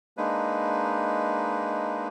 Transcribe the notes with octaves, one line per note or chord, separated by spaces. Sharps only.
G#3 A#3 D4 D#4 B4